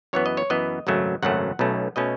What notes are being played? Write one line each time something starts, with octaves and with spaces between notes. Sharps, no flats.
F#2 E3 B3 C#5
D#5
C#5
F#2 E3 B3 D#5
G#1 F#2 C#3 F#3 A3
G#1 F#2 C#3 F#3 A3 F#5
B1 B2 A3 C#4
B2 A3 C#4 D#5